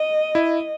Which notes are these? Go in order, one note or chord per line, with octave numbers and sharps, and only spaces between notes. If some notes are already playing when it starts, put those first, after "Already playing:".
Already playing: D#5
E4